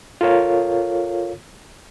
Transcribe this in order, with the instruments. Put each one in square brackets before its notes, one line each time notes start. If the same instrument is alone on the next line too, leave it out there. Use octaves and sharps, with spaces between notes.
[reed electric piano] F4 A4 A#4 C#5 F5